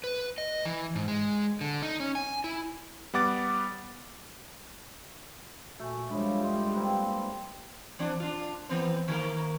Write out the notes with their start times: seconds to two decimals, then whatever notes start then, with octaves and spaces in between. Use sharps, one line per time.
0.04 B4
0.38 D#5
0.65 E3
0.95 G#2
1.08 G#3
1.61 D3
1.82 D#4
2.00 C#4
2.15 G#5
2.44 E4
3.14 G3 B3 F#5 D6 A6
5.80 A#2 A3 F#4 G#5
6.10 F3 G3 G#3 D4 E4 C#5
6.41 G2 G4 C6
6.74 A#3 C4 B4
7.99 E3 C4 D4
8.20 D4 F4
8.69 E3 B3 C4
9.08 D#3 A#3 A#4